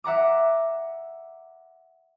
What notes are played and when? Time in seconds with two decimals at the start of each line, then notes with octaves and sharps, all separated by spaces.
0.04 E5 F#5 A#5 D6